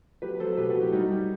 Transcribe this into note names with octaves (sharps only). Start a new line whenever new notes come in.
F#3 G4 B4
F#3 A4 C5
A4
B2 G4 B4
F#4 A4
F#3
E4 G4
G3 D#4 F#4
G3